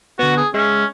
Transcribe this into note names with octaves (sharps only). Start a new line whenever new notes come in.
D3 B3 F#4
G#4
G#3 C#4 E5